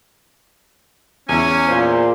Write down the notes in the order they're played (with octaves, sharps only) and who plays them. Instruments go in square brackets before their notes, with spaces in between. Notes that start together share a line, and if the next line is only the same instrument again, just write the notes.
[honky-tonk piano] E2 E4 [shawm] C#4 [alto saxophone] G#5
[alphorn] A#2 [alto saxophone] C5